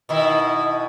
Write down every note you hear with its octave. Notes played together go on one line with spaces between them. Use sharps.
B2 D#3 E4